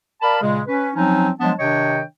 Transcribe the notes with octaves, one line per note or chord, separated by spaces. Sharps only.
A#4 D5 F5 A5 B5
A#2 C#3 G#3
C#4 B4
F3 F#3 C4 C#4 D#4
F3 F#3 G#3 B3 D4 A5
C3 D#3 D4 C#5 D#5 G5